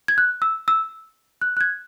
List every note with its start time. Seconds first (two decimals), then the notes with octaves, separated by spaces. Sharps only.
0.08 G#6
0.18 F#6
0.42 E6
0.68 E6
1.41 F#6
1.57 F#6
1.61 G#6